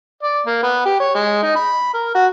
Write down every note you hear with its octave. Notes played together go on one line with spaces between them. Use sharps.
D5
A#3
B3
G4
C#5
G#3
D#4
B5
A#4
F#4